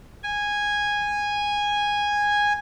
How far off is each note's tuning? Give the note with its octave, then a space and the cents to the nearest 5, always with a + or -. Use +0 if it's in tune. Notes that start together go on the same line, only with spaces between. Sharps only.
G#5 -10